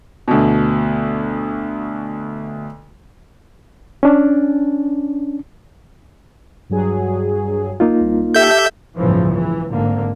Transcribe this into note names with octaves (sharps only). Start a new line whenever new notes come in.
D2 B2
C#4 D4
G2 F#3 G#4
A#3 D#4 F4
C2
G4 A4 E5 G6
G1 C#2 A2 C#3 E3 F3
E3
G#1 G#2 D3 A#3